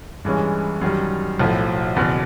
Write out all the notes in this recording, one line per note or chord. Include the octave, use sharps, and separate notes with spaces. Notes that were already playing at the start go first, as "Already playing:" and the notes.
G2 E3 G#3 C#4
F#2 D#3 G3
B1 A2 F3
F#1 E2 B2